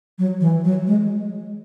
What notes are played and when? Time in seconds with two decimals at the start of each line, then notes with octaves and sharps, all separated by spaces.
0.19 F#3
0.41 E3
0.64 F#3
0.87 G#3